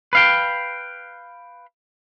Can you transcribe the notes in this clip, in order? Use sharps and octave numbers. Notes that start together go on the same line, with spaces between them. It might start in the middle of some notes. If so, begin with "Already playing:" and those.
B4 F5 G5